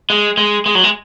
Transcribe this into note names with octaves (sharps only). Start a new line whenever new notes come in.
G#3
G#3
G#3
F#3
G#3